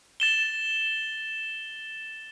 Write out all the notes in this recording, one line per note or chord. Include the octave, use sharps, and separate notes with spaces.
A6 E7 G7